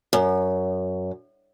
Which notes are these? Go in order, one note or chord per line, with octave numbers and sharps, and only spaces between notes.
F#2